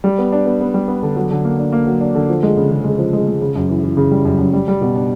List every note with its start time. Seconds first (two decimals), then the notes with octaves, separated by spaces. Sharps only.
0.04 G3
0.18 B3
0.32 D4
0.46 B3
0.60 B3
0.74 G3
0.88 B3
1.03 D3
1.16 F#3
1.31 D3
1.44 A#3
1.59 D4
1.72 A#3
1.86 F#3
2.01 D4
2.15 D3
2.29 F3
2.43 G#3
2.57 C#3
2.71 C#3
2.84 G#3
2.98 F3
3.13 G#3
3.27 G#3
3.41 C#3
3.56 F#2
3.69 E3
3.83 E3
3.97 C#3
4.11 G3
4.25 F#2
4.39 F#2
4.53 G3
4.68 G3
4.81 B2
4.95 D4